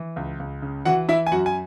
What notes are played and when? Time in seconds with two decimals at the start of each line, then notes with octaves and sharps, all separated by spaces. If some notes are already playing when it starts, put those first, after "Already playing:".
Already playing: E3
0.16 C#2
0.39 C#2
0.62 C#3
0.85 E3 F#4 F#5
1.08 E3 E4 E5
1.27 G#5
1.31 F#2 F#4 F#5
1.46 G#5